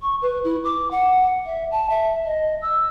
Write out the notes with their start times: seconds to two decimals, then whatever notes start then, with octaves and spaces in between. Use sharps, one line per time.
0.01 C#6
0.22 B4
0.44 E4
0.64 D6
0.91 F#5
1.46 E5
1.71 A5
1.90 E5
2.25 D#5
2.62 E6